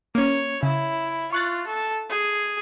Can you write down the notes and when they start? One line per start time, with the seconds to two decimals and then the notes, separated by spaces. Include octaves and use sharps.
0.15 A#3 C#4 C#5
0.63 C#3 E4
1.33 F4 C#6 F#6 A6
1.67 A4
2.10 G#4